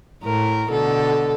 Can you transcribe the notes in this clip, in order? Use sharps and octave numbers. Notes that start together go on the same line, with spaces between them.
A2 A#4
B2 D3 A4